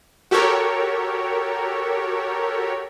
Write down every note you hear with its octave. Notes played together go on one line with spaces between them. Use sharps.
F#4 G4 A4 A#4 C#5